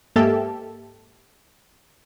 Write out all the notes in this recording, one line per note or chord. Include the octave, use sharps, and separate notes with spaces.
G#2 A#3 G4 A4 E5 A5